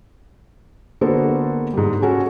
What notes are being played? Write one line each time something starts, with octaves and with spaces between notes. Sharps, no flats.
D3 A#3 B3 F#4 A4 C5
G#2 G3
C#4 F#4 A4